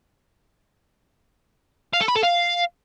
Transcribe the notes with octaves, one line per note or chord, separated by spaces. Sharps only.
F5
A4
B5
A4
F5